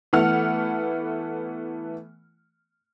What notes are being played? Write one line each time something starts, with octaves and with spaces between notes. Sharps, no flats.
E3 A3 B3 F#5 F6